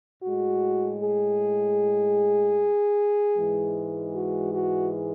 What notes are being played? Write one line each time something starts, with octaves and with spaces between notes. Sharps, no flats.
A2 F#4
G#3
G#4
G#2 E3 G#3
F#4
F#4